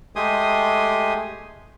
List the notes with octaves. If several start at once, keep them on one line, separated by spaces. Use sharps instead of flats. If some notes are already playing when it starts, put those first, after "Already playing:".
G#3 A3 G4 G#5 C6 D#6